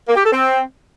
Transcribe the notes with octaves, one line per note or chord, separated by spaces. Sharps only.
A#3
G4
A4
C4